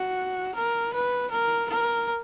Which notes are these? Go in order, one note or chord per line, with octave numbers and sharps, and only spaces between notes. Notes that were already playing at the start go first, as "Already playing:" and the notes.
Already playing: F#4
A#4
B4
A#4
A#4